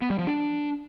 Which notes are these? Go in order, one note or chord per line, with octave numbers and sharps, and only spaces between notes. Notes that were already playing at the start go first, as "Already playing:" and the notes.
B3
G3
F3
D4